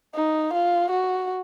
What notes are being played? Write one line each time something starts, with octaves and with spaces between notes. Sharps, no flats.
D#4
F4
F#4